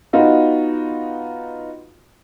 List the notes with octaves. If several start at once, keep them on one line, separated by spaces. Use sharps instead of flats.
B3 D#4 F4 F#4